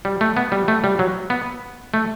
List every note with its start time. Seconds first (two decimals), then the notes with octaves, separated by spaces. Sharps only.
0.05 G3
0.21 A3
0.37 B3
0.52 G3
0.68 A3
0.84 G3
0.99 F#3
1.30 B3
1.94 A3